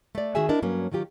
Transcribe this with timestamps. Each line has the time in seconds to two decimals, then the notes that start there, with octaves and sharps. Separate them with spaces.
0.15 A3 D5
0.35 D#3 F#4 G#4 E5 G#5
0.49 D4 E4 A#4 D#5
0.62 G2 F#3 A#3 C#4
0.92 D#3 F#3 F4 G4